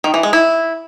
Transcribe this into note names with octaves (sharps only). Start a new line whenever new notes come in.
D#3
E3
G#3
E4